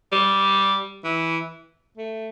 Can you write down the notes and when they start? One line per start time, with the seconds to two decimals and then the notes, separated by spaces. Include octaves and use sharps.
0.12 G3
1.04 E3
1.97 A3